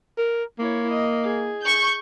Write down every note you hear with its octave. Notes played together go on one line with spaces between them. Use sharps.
A#4
A#3 E4 C#5
D#5
G#4
C#6 G6